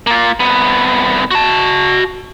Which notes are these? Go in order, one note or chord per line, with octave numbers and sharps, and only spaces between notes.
A#3 F4
C2 B3
F#4 A5